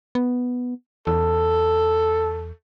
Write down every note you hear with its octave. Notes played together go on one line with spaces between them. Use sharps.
B3
E2 A4